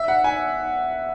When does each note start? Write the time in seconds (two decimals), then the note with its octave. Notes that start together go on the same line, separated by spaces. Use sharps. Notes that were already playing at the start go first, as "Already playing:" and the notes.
Already playing: E5
0.08 F#5
0.24 G#5